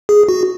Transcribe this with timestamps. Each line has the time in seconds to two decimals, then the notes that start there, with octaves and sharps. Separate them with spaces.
0.09 G#4
0.29 F#4